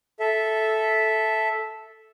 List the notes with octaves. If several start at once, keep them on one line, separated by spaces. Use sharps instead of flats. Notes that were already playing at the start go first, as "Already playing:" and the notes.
A4 E5